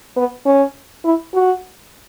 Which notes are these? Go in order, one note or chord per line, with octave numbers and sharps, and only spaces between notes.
B3
C#4
E4
F#4